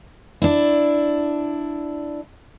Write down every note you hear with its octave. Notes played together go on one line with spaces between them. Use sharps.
D4 E4